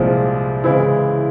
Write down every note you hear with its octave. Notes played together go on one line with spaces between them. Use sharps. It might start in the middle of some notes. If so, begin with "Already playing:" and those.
Already playing: C2 A#2 F3 G#3 C4
C#3 E3 G#3 C4 E4